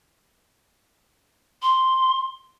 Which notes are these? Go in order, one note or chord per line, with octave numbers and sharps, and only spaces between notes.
C6